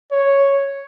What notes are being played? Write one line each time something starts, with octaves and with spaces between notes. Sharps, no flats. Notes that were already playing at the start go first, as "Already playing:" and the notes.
C#5